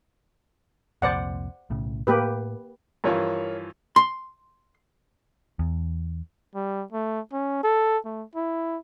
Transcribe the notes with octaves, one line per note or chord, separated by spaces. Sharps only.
C2 F2 A#2 C5 D5 F#5
B1 A2 C#3
A2 A#3 G4 B4
G2 E3 F3 A#4 C#5 F5
C6
E2
G3
A3
C#4
A4
A3
E4